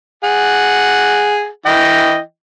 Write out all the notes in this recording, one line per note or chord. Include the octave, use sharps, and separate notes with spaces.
G#4 F#5
E3 D#5 G5